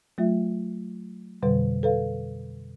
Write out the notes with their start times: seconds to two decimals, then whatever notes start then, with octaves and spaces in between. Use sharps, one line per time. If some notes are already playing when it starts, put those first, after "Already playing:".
0.18 F#3 A3 F4 E5
1.43 F2 B2 D3 G3 B4
1.83 A4 B4 F5